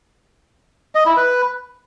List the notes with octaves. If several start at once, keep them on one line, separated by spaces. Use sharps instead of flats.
D#5
E4
B4